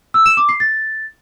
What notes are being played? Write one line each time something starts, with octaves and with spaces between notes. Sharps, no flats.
E6
E7
D6
C7
A6